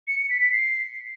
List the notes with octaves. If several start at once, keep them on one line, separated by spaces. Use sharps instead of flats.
C#7
C#7
B6
B6
C7